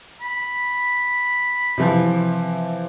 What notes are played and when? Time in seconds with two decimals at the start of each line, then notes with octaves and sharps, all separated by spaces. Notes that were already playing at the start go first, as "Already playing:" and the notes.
0.21 B5
1.78 C3 E3 F3